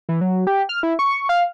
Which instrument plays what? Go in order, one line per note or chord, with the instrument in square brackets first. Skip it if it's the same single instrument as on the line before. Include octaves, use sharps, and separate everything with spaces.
[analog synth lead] E3
F#3
G4
F6
E4
C#6
F5